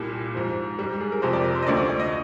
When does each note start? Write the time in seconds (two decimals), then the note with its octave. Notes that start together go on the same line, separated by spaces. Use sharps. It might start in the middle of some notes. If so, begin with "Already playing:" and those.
Already playing: C2 A#2 G3 G4
0.35 G#2 F3
0.79 G#2 G3
1.01 G#4
1.12 A#4
1.22 F2 C3 F3 C5
1.33 D5
1.44 A#4
1.55 C5
1.62 D#5
1.67 D2 D3 F3 D5
1.77 D5
1.89 D5
2.00 D#5